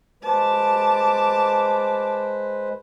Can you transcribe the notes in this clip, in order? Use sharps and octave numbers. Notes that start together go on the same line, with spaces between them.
G#3 B4 C5 A5 D6